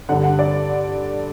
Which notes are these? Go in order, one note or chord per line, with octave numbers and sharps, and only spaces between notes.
G2 D3 F#5
F#5
D5